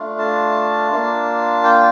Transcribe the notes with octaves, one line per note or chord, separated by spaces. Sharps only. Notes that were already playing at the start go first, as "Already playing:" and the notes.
Already playing: A3 D4 F4
A5
A#3 D4 F4
G5